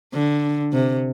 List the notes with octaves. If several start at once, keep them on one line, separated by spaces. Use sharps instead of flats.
D3
C3